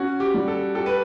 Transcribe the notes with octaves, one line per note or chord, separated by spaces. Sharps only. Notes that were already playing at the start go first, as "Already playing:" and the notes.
Already playing: C#4 F#4
G4
G3
A4
G4 A4
B4